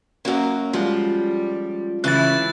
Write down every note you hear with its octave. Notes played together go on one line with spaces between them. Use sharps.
F#2 A#3 C#4 F#4
F3 G3 G#3 F4
A2 C#3 E3 E4 F#6 A6